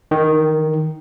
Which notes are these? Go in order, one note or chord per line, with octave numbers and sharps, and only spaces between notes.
D#3